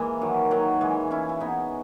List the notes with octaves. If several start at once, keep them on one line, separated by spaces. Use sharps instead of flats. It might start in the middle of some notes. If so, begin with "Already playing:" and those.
Already playing: E3 G#3 A#3
D#3 F#3
D#3 F#3
E3 G#3
C#4 E4
E4
B3 D#4